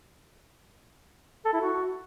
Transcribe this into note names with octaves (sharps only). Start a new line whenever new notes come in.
A4
E4
F#4